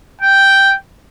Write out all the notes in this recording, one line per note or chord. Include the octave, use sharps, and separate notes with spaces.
G5